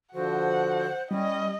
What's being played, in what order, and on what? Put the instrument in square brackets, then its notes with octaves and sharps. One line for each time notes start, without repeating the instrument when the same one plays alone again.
[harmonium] D3 F3 F#4 [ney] C5 [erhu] F#5
[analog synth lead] G3 [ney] C#4 [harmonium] E4 [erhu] D#5